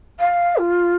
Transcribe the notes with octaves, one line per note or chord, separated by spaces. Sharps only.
F5
F4